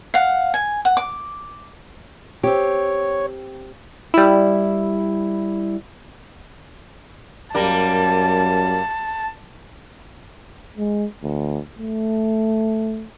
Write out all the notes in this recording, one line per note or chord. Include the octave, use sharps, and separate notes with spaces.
F5 F#5
G#5
F#5
D6
C4 G4 C#5
G3 E4
F#2 G3 A#3 A#4 A5
G#3
D2
A3